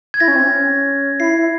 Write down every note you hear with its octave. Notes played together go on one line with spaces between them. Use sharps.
G#6
E4 A#6
C#4
C4
C#4
E4 C7
E4